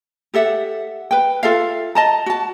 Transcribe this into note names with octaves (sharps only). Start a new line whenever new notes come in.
G4 A4 E5 F#5
B4 G5
F4 A4 E5 F5
D#5 A5 A#5
F#4 A5